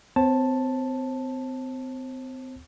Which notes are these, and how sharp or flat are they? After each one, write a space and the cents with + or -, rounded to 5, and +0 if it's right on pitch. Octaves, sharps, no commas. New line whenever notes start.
C4 -35 C5 +45 A5 +0